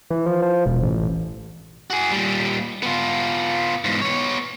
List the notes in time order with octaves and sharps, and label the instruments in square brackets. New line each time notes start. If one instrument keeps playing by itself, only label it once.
[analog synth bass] E3
F3
F3
E1
A1
[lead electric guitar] F#4 G#4
A#2 G3
B3 F4
E2 G#2
B3 C#5